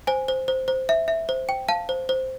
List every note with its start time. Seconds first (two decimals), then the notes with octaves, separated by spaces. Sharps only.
0.07 C5 G#5
0.28 C5
0.48 C5
0.68 C5
0.89 E5
1.08 E5
1.29 C5
1.49 G5
1.68 F5 A5
1.89 C5
2.09 C5